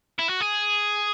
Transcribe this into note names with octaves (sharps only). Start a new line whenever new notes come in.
E4
F#4
G#4